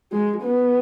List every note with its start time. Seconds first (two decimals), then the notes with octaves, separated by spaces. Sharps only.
0.12 G#3
0.43 B3